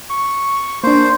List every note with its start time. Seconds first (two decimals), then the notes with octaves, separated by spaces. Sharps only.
0.10 C#6
0.83 A#3 D4 C5